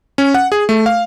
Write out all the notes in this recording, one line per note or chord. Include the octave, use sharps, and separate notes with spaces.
C#4
F#5
G#4
A3
F5